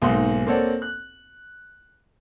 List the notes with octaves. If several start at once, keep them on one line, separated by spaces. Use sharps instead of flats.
B1 G#2 A#3 F#5 C6
A#3 C4 A4 C#5 D5 F#5
F#6